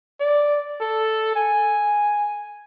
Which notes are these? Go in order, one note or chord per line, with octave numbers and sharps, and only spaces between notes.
D5
A4
G#5